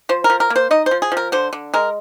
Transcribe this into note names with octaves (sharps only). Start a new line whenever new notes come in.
F3 C5
A#4
F3
A#4
A#3
C5
D#4 D#5
C5
F3
G#4
F3
A#4
D3 C5
D3
G#3 A#4